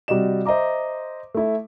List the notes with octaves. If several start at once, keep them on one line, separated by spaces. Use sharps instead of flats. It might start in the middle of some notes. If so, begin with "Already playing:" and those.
C3 G3 F#4 D5 D#5 E7
C5 D#5 E5 A#5 D6
A3 E4